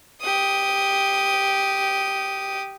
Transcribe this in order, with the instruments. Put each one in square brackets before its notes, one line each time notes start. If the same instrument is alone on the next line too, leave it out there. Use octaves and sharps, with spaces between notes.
[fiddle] G4 D#6